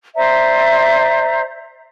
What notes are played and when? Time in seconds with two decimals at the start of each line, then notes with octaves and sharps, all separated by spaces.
0.16 C5 D5 E5 A#5